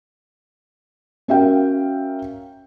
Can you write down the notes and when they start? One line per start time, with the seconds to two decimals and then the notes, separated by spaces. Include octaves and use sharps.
1.28 C#4 F#4 A#4 E5 F5 G5